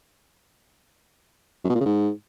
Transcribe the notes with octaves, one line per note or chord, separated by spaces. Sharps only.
F#2
B2
A#2
C#3
G#2